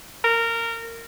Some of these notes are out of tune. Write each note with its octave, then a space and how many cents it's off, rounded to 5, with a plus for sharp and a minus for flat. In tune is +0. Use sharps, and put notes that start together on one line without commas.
A#4 -15